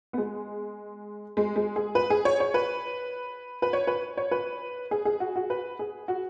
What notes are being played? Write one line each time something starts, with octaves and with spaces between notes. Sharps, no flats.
B3
G#3
G#3
G#3
G#4
B4
G#4
C#5
C#5
B4
B4
C#5
B4
C#5
B4
G#4
G#4
F#4
F#4
B4
G#4
F#4